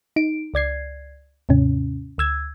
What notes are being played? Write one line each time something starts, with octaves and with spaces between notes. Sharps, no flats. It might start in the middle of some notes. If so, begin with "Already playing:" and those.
D#4 D7
C#2 D5 G#6 C7
D#2 G#2 C3 C#4
D2 E6 G#6